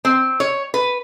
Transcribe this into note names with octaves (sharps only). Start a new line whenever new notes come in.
C4
C#5
B4